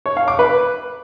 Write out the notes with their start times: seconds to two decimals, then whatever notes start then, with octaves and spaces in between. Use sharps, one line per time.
0.06 C#5
0.17 F5
0.28 D6
0.39 B4